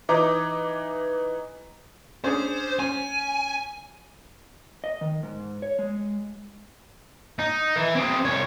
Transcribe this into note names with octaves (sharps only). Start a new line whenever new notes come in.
E3 D#4 D6
C#4 D4 G#4 C5
C#4 G#5
D#5
D#3
G#2
C#5
G#3
D#4
E3
C4 G#4
C2 C#5